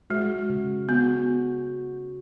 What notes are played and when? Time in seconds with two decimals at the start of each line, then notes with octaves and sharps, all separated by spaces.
0.10 G#3 F#4
0.50 C#3
0.89 B3 F#4